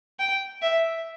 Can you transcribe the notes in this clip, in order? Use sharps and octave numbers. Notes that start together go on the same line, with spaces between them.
G5
E5